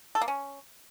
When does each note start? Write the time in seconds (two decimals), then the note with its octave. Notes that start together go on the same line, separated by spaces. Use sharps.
0.15 A4
0.21 A#3
0.28 C#4